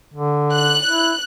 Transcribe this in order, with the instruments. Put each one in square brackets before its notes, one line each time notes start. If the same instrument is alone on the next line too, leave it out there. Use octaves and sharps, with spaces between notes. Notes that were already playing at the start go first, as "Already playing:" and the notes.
[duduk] D3
[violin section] F#6
[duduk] E4